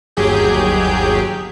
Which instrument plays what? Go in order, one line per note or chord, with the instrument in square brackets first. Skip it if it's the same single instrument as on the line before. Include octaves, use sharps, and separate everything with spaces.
[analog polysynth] G1 D#2 F#3 G4 G#4 G6